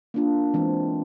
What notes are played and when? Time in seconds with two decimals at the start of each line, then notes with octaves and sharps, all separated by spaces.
0.14 A#3 D4 F4
0.54 E3 G#3 C4